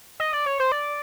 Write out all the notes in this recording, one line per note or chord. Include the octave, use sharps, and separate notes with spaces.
D#5
D5
C#5
C5
D5